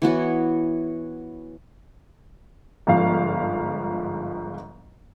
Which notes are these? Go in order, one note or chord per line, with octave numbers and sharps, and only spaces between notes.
E3 B3 F#4 C#5
G1 G#2 F3 F5